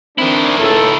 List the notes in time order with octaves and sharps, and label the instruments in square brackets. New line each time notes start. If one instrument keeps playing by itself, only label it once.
[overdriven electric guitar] D#3 E4 [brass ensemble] C4 D4
[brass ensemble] C#2 A2 A4